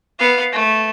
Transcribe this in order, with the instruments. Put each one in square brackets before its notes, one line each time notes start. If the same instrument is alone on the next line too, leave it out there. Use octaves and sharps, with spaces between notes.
[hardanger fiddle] B3 F5
A3